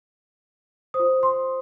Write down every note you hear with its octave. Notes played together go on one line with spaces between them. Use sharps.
C5 D#6
F4
C6